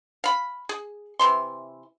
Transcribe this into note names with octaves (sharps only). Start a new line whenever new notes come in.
F5 B5
G#4
C3 E3 C6